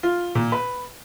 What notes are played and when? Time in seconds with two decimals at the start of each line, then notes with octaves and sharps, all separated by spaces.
0.03 F4
0.35 A#2
0.52 B4